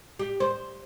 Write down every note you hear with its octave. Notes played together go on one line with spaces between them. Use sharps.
G4
C5